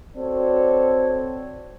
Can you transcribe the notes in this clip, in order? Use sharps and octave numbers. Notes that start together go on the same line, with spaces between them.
C4 D4 F#4 A4 C#5